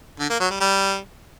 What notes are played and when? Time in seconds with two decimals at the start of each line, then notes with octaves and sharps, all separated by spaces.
0.20 D3
0.30 A#3
0.40 F#3
0.50 G3
0.60 G3